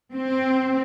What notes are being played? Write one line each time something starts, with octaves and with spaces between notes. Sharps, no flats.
C4